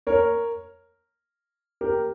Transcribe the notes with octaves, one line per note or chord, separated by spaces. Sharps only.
A#4 C#5
G4 A#4